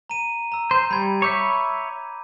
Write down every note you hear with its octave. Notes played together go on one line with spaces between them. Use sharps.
A#5 D#7
A#5 E6
C5 G6
G3 B5 G#6
C#5 E5 B5 D6 G6